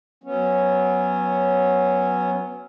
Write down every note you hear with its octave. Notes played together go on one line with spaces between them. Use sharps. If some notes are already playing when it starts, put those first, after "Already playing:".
F#3 B3 C#4